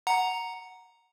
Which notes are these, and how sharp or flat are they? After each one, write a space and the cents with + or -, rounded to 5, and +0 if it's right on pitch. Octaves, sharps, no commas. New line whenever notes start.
F#5 +0 A#5 +0